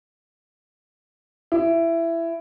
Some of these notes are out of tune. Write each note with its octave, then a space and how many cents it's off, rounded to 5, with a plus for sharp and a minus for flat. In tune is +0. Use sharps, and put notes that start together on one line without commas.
E4 +15